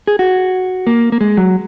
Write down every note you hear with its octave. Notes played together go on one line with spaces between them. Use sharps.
G#4
F#4
A#3
A#3
G#3
F#3